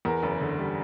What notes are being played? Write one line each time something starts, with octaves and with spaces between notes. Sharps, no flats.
E2 A#4
F#1
D3
G3